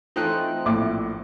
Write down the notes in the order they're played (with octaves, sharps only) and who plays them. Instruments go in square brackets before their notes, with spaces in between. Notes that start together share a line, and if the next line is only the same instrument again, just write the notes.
[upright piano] E3 C5 [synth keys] A3 C4 D#4 [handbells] F4 F#6
[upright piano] A#1 A2 D6